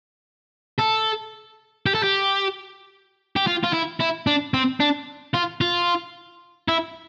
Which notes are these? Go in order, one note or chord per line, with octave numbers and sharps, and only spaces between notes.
A4
G4
A4
G4
G4
F4
F4
E4
E4
D4
C4
D4
F4
F4
E4